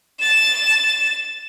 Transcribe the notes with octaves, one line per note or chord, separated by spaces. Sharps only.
A6 E7